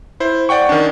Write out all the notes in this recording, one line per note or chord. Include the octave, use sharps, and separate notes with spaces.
E4 C5
D5 F#5 G5 C#6
D#3 C#4 D4